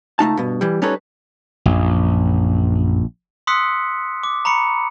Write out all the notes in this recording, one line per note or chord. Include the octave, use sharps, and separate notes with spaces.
C#2 A3 D#4 A5
G2 B2
E3 G3
G3 C#4 D#4 A4 B4 C#5
A#1 F#2
C6 D#6 E6 F#6 B6 C#7
D6
A#5 B5 C#6 C#7